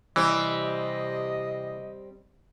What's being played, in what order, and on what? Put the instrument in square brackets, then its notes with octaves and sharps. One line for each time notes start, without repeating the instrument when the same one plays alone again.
[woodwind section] C3 D#5 [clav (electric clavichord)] E3 [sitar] G3 C4